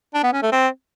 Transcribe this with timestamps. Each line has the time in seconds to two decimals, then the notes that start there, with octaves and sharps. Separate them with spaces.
0.14 D4
0.23 B3
0.33 C#4
0.42 A3
0.52 C4